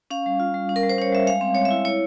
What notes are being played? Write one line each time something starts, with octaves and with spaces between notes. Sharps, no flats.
C#4 F5
G3
F4
G3
C#4
A#4
G3
C5
C#4 C#5
G3 E5
G#3 F5
C4
G#3 C#5
E5
E4
E4 C#5